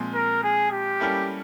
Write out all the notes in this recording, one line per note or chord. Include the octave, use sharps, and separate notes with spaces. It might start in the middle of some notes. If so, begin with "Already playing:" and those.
Already playing: A#2 F3 G#3 C4
A#4
G#4
G4
G3 A#3 C#4 E4 A4